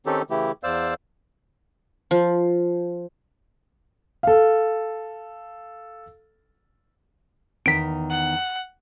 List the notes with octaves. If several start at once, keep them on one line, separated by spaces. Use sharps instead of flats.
D#3 C4 C#4 D#4 G4 A4
C#3 E3 A3 E4 G4
E2 C5 D5 F5 E6
F3
A4 F5
E2 D#3 B6 D7
F#5